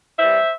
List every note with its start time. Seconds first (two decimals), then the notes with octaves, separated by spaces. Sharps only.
0.18 E3 G3 C4 C5 E5